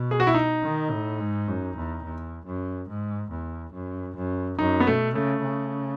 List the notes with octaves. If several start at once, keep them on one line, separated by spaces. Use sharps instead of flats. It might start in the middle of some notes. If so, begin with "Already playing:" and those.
Already playing: B2
G#4
F#4
E4
D#4
D#3
A2
G#2
F#2
E2
E2
F#2
G#2
E2
F#2
F#2
F#2 D#4
B3
B2 A3
C#3 A3
C#3